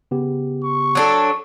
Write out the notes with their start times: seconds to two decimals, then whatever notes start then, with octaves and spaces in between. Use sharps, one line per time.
0.11 C#3 B3 G4
0.64 C#6
0.95 F#3 D4 A4